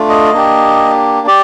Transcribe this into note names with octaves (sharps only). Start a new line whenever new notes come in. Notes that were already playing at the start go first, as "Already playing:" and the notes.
Already playing: A3 D4 F4
D#5
A#3 D4 G4
G4 D5